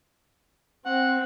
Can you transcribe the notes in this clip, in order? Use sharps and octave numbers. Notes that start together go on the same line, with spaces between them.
C4 F#5